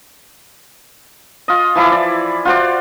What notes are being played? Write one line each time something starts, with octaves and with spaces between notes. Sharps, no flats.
F4 D#5
E3 F3 E4 D6
D5
F4 F#4 C5 D5